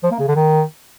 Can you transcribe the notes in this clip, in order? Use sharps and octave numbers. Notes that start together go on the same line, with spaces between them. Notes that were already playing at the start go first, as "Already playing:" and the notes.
F3
A#3
C#3
D3
D#3